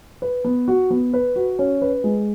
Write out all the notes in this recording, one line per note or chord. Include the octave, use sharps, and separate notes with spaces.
B4
B3
F#4
B3
B4
F#4
C#4
B4
G#3